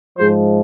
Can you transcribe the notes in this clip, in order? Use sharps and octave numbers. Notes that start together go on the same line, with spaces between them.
G#2 F3 G#3 G#4 C5